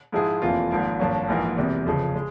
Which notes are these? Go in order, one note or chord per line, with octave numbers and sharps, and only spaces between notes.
G#2 F3 G#3 E4 G#4
F1 F2 E3 A#3 F4
G#1 G#2 F3 A#3
G#1 G2 F3 A#3 C#4
A#1 G#2 E3 A#3
E1 E2 C3 G3 A#3
G1 F2 C#3
G#3